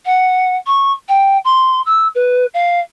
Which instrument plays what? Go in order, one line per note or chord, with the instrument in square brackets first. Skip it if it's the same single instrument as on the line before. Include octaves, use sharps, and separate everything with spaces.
[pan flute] F#5
C#6
G5
C6
E6
B4
F5